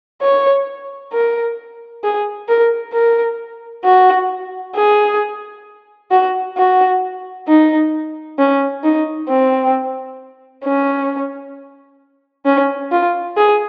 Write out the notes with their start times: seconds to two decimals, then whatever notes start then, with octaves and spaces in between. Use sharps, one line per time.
0.22 C#5
1.13 A#4
2.04 G#4
2.48 A#4
2.93 A#4
3.84 F#4
4.76 G#4
6.11 F#4
6.57 F#4
7.48 D#4
8.38 C#4
8.83 D#4
9.28 C4
10.64 C#4
12.45 C#4
12.92 F4
13.37 G#4